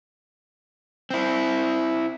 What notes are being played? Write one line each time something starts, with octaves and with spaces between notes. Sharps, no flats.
C4 E4